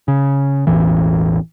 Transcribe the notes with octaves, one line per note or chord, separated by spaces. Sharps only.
C#3
E1 A1 E3